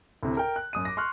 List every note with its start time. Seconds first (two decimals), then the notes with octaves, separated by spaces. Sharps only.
0.23 D2 A2 C3
0.37 A#4 G5
0.56 F#6
0.73 F#2 D#6 D#7
0.85 D6 A#6
0.97 C6 C#6 F6 F#6